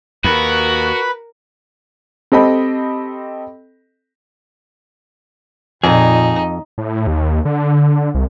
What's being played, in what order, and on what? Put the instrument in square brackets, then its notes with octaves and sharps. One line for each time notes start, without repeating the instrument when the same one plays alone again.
[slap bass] D#2 [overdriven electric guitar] F#4 [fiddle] A#4 [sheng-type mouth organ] B4 B5
[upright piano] C4 G4 A4 D#5 G5 B5
[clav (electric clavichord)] F2 [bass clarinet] A#2 [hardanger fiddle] D#4 [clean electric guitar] G#4
[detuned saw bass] A2
D#2
D3
C2